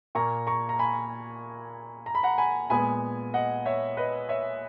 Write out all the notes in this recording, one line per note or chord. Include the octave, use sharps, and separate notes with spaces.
A#2 A#3 A#5 C#6
A#5 C#6
A#5
G#5 B5
A#5
B5
F#5 A#5
G#5 B5
A#2 G#3 B3 G#5 B5
D#5 F#5
C#5 E5
B4 D#5
C#5 E5